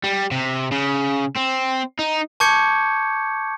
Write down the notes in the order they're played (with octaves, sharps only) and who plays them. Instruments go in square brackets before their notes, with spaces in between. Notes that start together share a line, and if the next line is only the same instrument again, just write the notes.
[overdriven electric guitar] G3
C3
C#3
C4
D#4
[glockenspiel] A5 C#6 D6 G6 G#6 C#7